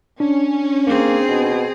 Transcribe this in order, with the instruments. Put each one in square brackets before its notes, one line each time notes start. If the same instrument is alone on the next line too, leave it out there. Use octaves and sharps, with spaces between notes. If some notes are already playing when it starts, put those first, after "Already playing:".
[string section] C#4 [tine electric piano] D4
[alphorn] A#3 [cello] C4 G#4
[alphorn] B2